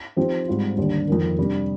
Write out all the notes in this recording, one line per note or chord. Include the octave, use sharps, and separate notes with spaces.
F3 C4 D#4 G4 C5
G#2 G3 C4 F4
D#2 D3 G3 D4 G4
F2 D#3 A#3
C3 G3 D4